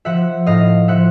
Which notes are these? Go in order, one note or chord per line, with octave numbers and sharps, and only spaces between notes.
F3 E5 F#5
A2 D#5 F5
F3 E5 F#5